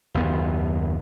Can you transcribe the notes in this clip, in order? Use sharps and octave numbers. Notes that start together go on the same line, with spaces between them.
F#1 D#2 B3